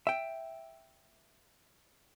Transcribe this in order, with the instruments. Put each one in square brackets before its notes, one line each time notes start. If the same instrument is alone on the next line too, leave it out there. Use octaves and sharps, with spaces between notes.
[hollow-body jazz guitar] E5 G5